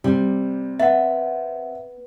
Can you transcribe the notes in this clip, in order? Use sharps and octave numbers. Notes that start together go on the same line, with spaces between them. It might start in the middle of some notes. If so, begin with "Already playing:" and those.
C3 G3
B3 E5 F#5